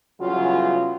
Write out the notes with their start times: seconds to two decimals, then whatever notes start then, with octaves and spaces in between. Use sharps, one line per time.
0.20 E2 C#3 F#3 G3 F4